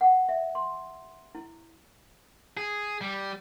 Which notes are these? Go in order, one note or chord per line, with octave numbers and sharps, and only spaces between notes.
F#5
E5
C6
E4
G#4
G3